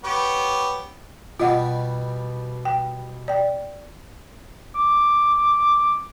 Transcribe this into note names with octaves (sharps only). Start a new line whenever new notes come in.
B3 G4 C#5
B2 G3 F4 D#5 F#5
G5
D5 G5
D6